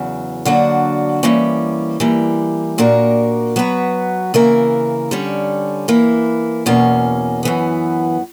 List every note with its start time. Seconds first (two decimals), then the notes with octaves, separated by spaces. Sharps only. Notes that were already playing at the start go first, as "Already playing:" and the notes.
Already playing: E2 C#3 F#3
0.45 D3 F#3 A#3 D4 F#4
1.23 E3 G3 A#3 C#4
2.00 E3 G3 A#3
2.78 A#2 A#3 D4 F#4 A#4
3.56 F#3 B3 F#4 B4
4.34 C#3 E3 A#3 E4 A#4
5.11 D3 G3 C#4
5.88 E3 A#3 E4
6.66 E2 B2 A#3 C#4
7.43 F#2 E3 B3